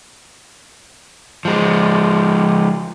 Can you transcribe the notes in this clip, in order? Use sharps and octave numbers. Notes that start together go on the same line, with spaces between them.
F3 G#3